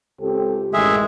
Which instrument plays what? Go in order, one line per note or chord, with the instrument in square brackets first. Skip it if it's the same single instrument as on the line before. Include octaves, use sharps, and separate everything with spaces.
[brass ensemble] C#2 C4 A4 [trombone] G4
[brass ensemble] A1 F#2 D#3 [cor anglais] G#3 [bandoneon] G#4 E5